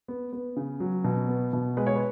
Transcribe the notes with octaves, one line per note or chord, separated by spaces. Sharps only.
B3
B3
C#3
F#3
B2
B3
B2
G#3 B4
C#5
B4